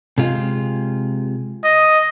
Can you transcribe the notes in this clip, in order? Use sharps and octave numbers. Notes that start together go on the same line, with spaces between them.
C3 G#3 F4
D#5